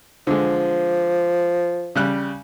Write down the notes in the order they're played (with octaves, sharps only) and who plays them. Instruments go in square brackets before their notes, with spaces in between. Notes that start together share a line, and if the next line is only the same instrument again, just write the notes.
[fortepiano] D3 G#3 [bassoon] F3
[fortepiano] C#3 G3 F#6